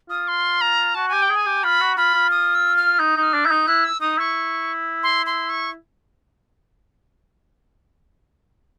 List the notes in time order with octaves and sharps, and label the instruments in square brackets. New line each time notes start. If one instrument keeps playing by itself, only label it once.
[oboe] F4 [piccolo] D#6
[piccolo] C6
A#5
[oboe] F#4 [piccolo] A5
[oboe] G4 [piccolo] G#5
[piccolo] G5
[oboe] G#4
[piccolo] G#5
[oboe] G4
[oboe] F4 [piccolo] B5
[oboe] F#4
[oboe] F4 [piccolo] B5
[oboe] F4
[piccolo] D#6
E6
F6
[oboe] D#4 [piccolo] G6
[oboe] D#4
[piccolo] F6
[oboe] D4
[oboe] E4 [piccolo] G6
[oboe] D#4
[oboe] E4 [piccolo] F#6
[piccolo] E6
[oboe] D#4 [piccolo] D#6
[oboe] E4 [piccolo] C#6
[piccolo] C6
C6
C#6